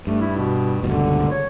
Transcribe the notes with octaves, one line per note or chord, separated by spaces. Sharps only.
G2 A3
E4
B2
C#2 G2 B2 D3
C#5